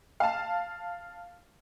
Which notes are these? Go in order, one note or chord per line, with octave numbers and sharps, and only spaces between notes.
F5 A5